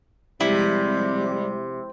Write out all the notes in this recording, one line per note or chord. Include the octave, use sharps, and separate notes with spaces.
C3 F3 G3 G#3 C4 E4